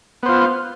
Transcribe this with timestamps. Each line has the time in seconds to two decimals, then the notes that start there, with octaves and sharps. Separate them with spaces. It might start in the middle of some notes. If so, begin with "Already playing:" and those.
0.23 B3
0.26 C5
0.29 F4